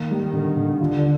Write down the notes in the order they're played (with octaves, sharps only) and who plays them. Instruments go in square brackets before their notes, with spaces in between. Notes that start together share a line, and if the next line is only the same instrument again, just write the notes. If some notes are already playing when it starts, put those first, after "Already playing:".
Already playing: [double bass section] D#3 [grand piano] A#3
[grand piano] G3
D3
D3
[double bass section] D3 [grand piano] F4